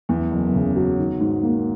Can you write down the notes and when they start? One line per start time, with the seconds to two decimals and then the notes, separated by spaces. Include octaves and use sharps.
0.09 E2
0.31 F#1
0.54 C#3
0.76 F#3
0.99 D#3
1.21 G#2
1.43 A#3